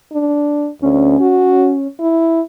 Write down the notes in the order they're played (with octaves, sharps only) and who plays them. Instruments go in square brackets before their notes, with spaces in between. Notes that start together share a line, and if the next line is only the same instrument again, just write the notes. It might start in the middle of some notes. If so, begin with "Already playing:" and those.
[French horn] D4
[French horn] D2 [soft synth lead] C#4
[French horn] F#4
E4